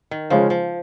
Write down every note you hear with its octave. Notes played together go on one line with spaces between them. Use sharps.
D#3
C#3 F3 G#3 C#4 F4
F3